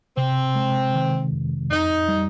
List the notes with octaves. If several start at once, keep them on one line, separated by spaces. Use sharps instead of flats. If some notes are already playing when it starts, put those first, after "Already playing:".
C3 C4
G#3
D#3
F2
F2 D#4
G3